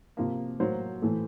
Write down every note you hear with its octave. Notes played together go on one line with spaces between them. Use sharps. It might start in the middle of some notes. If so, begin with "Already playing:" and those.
C3 F3 A#3
A2 F#3 A#3 C5
A2 E3 A3